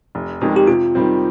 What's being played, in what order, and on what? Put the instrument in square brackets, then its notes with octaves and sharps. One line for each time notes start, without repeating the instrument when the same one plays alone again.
[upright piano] F1
F2 D#3 G#3
[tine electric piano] G4
[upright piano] C3 [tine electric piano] F4
[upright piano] D#3 G3 C4